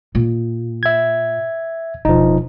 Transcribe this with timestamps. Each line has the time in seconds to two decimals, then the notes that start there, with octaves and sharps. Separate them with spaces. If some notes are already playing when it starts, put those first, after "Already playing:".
0.15 A#2
0.83 E5 G#6
2.05 E1 F3 D#4